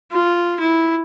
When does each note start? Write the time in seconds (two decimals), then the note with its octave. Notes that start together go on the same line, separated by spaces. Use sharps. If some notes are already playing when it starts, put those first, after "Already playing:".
0.12 F4
0.60 E4